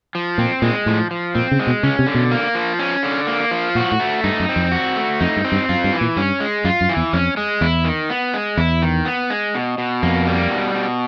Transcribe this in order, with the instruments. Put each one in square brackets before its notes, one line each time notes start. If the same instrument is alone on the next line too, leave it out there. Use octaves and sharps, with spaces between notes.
[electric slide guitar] F3
[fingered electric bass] A#2 [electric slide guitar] C4
[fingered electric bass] A#2 [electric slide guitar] G#3
[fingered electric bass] A2 [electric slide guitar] F3
[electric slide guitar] F3
[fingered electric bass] A#2 [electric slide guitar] C4
[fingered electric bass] C#3
[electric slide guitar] G#3
[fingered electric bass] B2
[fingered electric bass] C#3 [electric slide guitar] C#4
[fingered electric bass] C3
[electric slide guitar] D3
[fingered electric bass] B2
[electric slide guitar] A#3
F3
C#4
D3
A#3
F3
[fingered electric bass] A#2 [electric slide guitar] F#4
[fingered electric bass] A2
[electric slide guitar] A3
[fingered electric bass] G2 [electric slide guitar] D#4
[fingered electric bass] F#2
[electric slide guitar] C4
[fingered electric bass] F2
[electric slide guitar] F#4
A3
[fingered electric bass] F2 [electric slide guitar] D#4
[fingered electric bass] G2
[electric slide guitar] C4
[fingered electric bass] G2
[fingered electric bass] F#2 [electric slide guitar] F4
[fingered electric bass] G2
[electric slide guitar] E3
[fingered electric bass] A#2
[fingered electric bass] G2 [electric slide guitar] C#4
[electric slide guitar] G#3
[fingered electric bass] F#2 [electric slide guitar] F4
[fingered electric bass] F#2
[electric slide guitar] E3
[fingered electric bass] E2
[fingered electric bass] F2 [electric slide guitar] C#4
[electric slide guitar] G#3
[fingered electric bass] E2 [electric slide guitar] E4
[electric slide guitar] D#3
B3
G#3
[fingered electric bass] E2 [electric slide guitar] E4
[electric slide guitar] D#3
B3
G#3
B2
B2
[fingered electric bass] F2 [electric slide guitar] A#3
[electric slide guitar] G3
B2
B2